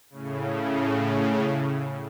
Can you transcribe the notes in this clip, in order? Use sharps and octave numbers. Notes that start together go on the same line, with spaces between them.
A2 C#3